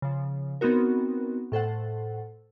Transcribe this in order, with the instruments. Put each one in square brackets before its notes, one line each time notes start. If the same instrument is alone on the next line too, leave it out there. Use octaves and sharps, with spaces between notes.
[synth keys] C#3 F3
B3 C4 D#4 F#4 A#4
A2 A4 C5 F#5